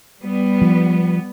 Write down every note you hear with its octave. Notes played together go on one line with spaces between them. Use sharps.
G3 B3
F3